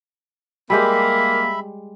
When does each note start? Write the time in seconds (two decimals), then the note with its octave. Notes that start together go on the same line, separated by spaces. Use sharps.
0.70 G3 G#3 A#3 G4 E5 B5